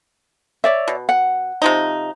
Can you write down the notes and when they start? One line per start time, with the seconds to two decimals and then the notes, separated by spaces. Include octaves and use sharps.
0.64 C#5 D5 E5
0.88 B2
1.09 F#5
1.62 C3 F3 D#4